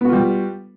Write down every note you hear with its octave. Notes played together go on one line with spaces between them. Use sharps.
G3 B3 F4 F#4